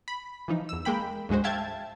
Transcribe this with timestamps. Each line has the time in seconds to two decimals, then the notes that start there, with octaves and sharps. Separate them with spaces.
0.08 B5
0.48 E3 F3 D#4
0.69 E2 E6
0.85 G#3 A#3 G5 B5
1.29 D2 G#2 G#3 F#4 C5
1.44 E5 F5 G5 A5 G#6